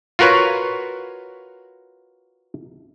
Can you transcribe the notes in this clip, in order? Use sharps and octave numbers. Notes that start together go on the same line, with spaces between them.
F4 F#4 A#4 B4 C#5